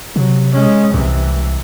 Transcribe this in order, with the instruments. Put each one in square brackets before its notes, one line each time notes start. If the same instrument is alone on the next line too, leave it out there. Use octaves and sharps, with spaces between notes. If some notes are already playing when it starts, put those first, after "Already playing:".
[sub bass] C3 [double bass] F#3
[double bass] G#3 C#4
[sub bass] C2 [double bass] C3 E3